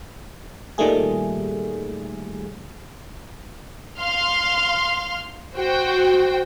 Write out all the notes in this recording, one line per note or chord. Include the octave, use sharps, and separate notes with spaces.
A#2 D#3 G3 A3 G#4
F5 C6 F6
F#4 C5 G5